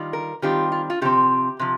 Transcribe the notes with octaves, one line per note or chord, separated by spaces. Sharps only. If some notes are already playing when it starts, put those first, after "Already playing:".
Already playing: D#3 G3 F4
A#4
D#3 G3 C4 F4 G4
F4
F4
C3 F3 C4 G4
C3 F3